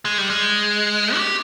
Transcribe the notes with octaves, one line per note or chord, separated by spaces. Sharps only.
G#3
G3
G#3
G4